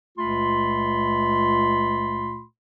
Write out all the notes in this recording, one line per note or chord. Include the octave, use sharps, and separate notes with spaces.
C#2 A#2 A3 F4 B5 C6